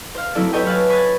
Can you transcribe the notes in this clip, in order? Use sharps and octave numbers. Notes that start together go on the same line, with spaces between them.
C5 F5
F#3 A3 C4 E4 A4 D5
G4 A4 B4 C#5 D#5 G5
B4 C#5 F5 F#5 G#5 A5
B5 C#6 D#6 F#6 G#6 A6